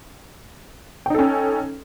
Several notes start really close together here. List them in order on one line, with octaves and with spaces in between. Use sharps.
G5 D#4 A4 C#4